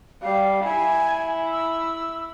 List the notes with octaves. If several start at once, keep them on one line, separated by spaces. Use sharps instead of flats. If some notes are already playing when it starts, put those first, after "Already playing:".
G3 F5
E4 G#5
E6